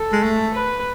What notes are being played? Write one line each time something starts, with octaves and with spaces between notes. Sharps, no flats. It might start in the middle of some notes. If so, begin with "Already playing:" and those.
Already playing: A4
G#3
A3
B4